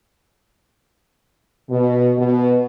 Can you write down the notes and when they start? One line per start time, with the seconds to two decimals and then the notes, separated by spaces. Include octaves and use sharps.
1.69 B2
2.18 B2